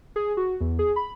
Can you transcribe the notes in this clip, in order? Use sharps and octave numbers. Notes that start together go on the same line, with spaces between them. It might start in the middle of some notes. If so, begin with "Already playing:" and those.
G#4
F#4
E2
G#4
B5